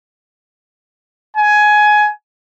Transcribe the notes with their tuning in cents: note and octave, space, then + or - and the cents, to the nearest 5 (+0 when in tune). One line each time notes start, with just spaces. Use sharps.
G#5 +15